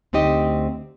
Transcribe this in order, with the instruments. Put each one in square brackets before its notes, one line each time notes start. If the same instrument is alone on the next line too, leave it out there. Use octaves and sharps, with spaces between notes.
[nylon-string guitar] D2 C4 D#4 G4 D#5